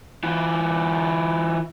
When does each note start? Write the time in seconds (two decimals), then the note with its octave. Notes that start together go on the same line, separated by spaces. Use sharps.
0.24 E3 F4